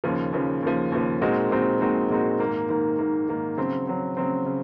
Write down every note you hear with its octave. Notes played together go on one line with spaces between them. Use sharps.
D#2 C#3 F3
D#2 C#3 F3
D#2 C#3 F3
D#2 C#3 F3
A#2 G#3 C4 D#4 F#4
A#2 G#3 C4 D#4 F#4
A#2 G#3 C4 D#4 F#4
A#2 G#3 C4 D#4 F#4
G#2 D#3 A#3
G#2 D#3 A#3
G#2 D#3 A#3
G#2 D#3 A#3
C#3 F#3 C4
C#3 F#3 C4
C#3 F#3 C4
C#3